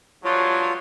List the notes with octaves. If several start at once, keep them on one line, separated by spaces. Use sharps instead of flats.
G2 F3 F#3 F4 C#5